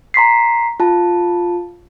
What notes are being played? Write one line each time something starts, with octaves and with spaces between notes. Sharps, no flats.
A#5 C6 B6 C7
F4 A5